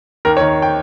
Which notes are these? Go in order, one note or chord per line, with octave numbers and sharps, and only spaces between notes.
D#2 A#4
C#5
D#3
G5